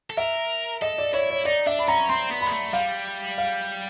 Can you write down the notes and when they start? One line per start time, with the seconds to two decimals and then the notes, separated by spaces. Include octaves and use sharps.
0.10 A4
0.17 A#4 E5
0.82 A4 D#5
0.98 D5
1.14 E4 C#5
1.30 C#5
1.45 D#4 D5
1.67 D4 E5
1.79 B5
1.88 C#4 A#5
2.09 C4 C6
2.31 B3
2.41 G#3 B5
2.52 A3
2.73 G3 F5
3.38 F5